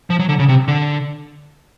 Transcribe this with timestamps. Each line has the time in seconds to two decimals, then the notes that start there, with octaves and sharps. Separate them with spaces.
0.10 F3
0.19 F#3
0.29 D3
0.39 C#3
0.49 C3
0.68 D3